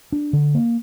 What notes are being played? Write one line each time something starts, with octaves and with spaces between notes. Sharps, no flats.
D4
D3
A#3